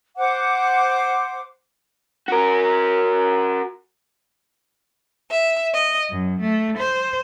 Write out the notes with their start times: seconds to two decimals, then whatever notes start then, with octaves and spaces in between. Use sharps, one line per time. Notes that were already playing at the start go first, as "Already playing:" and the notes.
0.17 C5 F#5 D6
2.28 F#4 A#4
5.29 E5
5.72 D#5
6.10 F#2
6.40 A3
6.77 C5